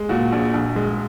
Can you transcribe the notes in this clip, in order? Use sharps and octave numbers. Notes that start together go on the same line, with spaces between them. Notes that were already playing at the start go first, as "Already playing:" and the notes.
Already playing: G#3
A#2 F#4
A#1
A#1
G#3